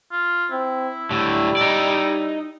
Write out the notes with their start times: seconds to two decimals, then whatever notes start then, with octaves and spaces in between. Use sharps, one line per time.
0.11 F4
0.51 C4 E4
1.11 A2 D3 G3
1.57 D#4 D5